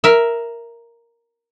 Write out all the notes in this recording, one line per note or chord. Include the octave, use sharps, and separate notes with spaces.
A#4 E5